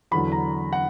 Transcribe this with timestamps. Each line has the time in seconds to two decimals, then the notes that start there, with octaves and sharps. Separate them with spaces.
0.11 E2 D3 F#3 B5
0.32 A#5
0.73 F#5